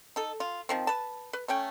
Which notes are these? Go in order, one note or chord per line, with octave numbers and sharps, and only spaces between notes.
D#4 A4
F4
D#3 F3 C4
B4 A5
B4
A3 C#4 G5